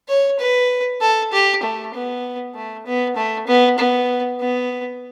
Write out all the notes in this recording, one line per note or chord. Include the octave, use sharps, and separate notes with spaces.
C#5
B4
A4
G4
A3
B3
A3
B3
A3
B3
B3
B3